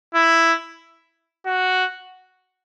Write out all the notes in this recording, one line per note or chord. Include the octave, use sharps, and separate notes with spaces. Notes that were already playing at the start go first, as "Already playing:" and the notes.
E4
F#4